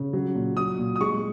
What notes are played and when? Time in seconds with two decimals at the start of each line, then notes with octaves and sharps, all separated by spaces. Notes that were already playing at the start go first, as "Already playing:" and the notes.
Already playing: C#3
0.13 F#3
0.35 A#2
0.57 F#3 D#6
0.79 A#2
0.96 D#6
1.01 G#3 C#6